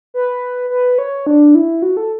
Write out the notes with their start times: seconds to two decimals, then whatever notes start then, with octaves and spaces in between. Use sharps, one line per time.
0.14 B4
0.70 B4
0.98 C#5
1.27 D4
1.55 E4
1.82 F#4
1.97 A4